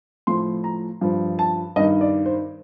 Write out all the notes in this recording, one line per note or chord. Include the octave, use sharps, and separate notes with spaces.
A2 F3 C6
A#5
G2 F3
A5
G2 D#3 D#5
D5
C5